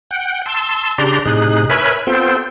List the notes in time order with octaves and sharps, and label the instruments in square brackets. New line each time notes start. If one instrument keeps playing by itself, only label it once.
[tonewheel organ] F#5 G5
A5 C6 E6
C#3 D4 G4 D5 A#5 C6
A2 C3 D#4 G#4 F#6
A#4 B4 C#5 E5 G#5 B5
B3 C4 F4 A4 C5 G5